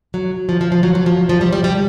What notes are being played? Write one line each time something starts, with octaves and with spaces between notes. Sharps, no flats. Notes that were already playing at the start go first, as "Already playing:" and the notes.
F#3
F3
F3
F3
F#3
F#3
F3
F3
G3
G3
G3